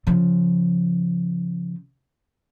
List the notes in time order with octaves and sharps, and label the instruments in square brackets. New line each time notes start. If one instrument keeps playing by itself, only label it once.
[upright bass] C#3 F3